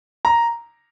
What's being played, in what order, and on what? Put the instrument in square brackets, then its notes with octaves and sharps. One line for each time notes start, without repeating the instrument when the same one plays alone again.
[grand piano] A#5